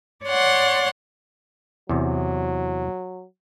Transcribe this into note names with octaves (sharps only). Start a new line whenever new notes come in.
C#5 D5 F#5 C6
E2 C3 F#3